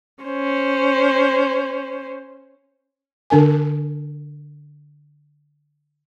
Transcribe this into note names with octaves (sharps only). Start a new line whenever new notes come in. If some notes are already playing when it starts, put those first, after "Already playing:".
C#4 C5
D3 D4 A#4 G#5